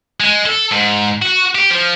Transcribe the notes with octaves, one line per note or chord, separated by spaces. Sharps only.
G#3
A4
G#2
F#4
G4
F3